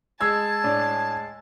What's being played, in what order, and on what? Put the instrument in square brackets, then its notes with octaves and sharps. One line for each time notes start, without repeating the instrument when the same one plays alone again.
[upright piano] G#3 E6 G#6 [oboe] G#5 [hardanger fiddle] A5
[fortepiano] A2 D4 D5